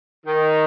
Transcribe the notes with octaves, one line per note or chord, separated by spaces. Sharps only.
D#3